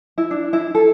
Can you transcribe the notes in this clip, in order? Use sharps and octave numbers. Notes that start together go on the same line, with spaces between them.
E4
D4
E4
A4